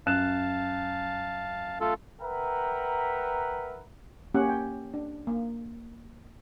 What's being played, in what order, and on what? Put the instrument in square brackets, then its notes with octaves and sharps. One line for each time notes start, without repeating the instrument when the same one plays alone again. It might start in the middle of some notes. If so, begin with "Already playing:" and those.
[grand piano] F#2 F#6 E7 [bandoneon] F5 A5
[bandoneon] A3 F4 A4
[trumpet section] A#4 B4 E5 F#5 G5 A#5
[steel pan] A#3 C#4 G4 F#5
G5
D4
A#3